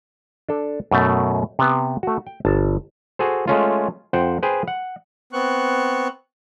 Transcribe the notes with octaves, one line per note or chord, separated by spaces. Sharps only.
D4 A4
F#2 B2 A3
C3 B3
A3 F#4
G5
G1 A5
F#4 G#4 A4 C5
G#3 A3 C#4 F4
F2 C5 F#5 G5
G#4 B4 C5 G5
F#5
B3 C4 C#6 F#6